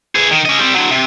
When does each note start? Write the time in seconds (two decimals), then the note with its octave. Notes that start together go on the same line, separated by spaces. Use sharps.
0.15 G#4 B4
0.31 D#3
0.46 C#4 D#5
0.59 G3 C4
0.74 D3 F#3
0.91 C3